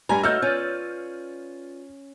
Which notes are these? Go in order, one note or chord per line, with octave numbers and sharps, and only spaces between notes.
G2 G3 G#5 A#5
A3 D#4 F#4 C#5 F#5 E6 F6 G6
C#4 F4 B4 D5